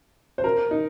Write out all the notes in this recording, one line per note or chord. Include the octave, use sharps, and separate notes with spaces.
C5
A#4
D#4